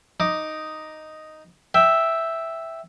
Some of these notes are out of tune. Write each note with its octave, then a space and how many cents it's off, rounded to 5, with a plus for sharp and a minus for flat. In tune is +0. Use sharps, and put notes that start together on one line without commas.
D#4 +0 D6 +0
E5 +0 G5 +0